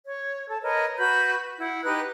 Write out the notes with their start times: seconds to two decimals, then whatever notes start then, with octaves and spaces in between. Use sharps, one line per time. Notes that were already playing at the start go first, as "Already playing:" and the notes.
0.07 C#5
0.49 A4 A5
0.62 A#4 B4 C#5 D#5
0.98 F#4 B4 B5 G6
1.58 E4 F#5
1.84 D#4 G4 B4 F#6